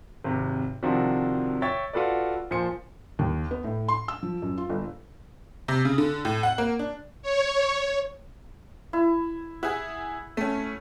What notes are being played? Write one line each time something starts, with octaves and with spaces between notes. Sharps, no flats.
G#1 C3
C3 D#3 F3 C4 D4 F#4
C#5 E5 G5 C#6 A6
F4 F#4 A4 B4 D5
A#2 F3 C5 G#5 C#7
D#2
B3
A2
C6
E6
F3
F#2
F4
G1
C3
C#3
D3
A2
F#5
A#3
D4
C#5
E4
E4 G#4 F#5
A3 C#4